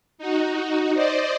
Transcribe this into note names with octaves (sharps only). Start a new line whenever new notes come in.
D#4 F#4
C5 D5 D#5